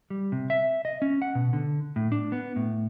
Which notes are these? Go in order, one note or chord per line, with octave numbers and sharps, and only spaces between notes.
G3
C3
E5
D#5
C#4
F#5
B2
D3
A2
D4
B3
A2